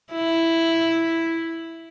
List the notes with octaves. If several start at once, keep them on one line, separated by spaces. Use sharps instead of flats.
E4